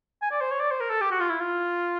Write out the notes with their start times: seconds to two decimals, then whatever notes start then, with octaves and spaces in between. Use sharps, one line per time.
0.22 G#5
0.31 D5
0.41 C5
0.51 C#5
0.60 D5
0.71 C5
0.80 A#4
0.90 A4
1.01 G4
1.11 F#4
1.20 F4
1.30 E4
1.40 F4